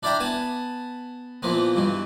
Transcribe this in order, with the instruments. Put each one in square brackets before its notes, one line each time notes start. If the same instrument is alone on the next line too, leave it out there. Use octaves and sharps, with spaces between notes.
[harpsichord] D4 E4 D5 E5 G5 A#5
B3 G#5 A5
A#2 E3 F3 A#3 B3
G2 B2 E3